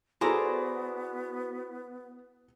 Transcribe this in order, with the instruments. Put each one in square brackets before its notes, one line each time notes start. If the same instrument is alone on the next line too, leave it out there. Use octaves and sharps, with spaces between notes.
[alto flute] B3 [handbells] E4 F#4 [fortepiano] G#4 A4 [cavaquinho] C5 D5 A#5